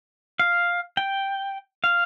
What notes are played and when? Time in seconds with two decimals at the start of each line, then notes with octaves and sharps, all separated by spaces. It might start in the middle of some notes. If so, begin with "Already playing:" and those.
0.39 F5
0.97 G5
1.84 F5